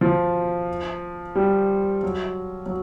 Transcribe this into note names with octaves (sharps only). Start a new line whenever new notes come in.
F3
G3
F#3
F#3